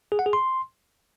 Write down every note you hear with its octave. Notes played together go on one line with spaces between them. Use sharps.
G#4
F#5
G#4
C6